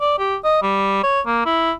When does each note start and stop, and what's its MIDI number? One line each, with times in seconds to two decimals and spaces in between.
0.01 0.16 74
0.19 0.36 67
0.44 0.59 75
0.62 0.99 55
1.04 1.21 73
1.26 1.44 58
1.46 1.73 64